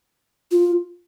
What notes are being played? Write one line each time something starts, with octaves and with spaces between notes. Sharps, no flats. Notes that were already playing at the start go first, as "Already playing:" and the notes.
F4